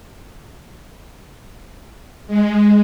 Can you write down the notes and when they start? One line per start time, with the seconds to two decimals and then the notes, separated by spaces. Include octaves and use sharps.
2.27 G#3